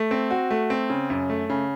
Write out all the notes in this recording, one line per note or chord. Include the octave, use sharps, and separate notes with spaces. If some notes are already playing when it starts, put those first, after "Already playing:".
Already playing: A3
C4
F#4
A3
C4
C#3
F#2
A3
C#3